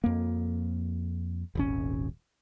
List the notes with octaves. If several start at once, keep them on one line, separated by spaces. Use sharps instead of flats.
F2 A#3
D#1 G#1 C#4